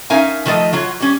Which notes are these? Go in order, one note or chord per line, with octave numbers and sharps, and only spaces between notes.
C#4 D#4 A#4 E5 F5 G#5
D#3 F3 A3 C5 D#5
F#3 F4 C#5
G3 C#4